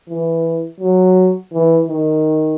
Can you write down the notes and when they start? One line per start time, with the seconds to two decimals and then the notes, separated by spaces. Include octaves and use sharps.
0.10 E3
0.80 F#3
1.53 E3
1.89 D#3